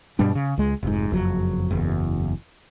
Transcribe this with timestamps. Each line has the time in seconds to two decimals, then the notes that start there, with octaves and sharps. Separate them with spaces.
0.19 G2 B2 G3 D4
0.35 C#3
0.57 C#2 G#3
0.83 F1 G#2
1.11 F#1 F2 F#3
1.71 F#1 E2